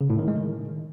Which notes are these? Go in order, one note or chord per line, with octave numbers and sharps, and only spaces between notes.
C#3
A2
D#3
G#3
D#3